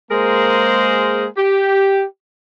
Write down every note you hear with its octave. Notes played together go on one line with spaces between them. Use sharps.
G#3 A#3 G#4 A#4 C5
G4